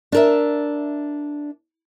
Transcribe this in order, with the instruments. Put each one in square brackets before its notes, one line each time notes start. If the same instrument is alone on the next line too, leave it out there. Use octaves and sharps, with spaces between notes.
[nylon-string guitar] D4 A#4 E5